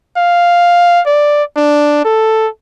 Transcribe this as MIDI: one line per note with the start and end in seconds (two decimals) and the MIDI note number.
0.17 1.00 77
1.07 1.43 74
1.57 2.01 62
2.05 2.48 69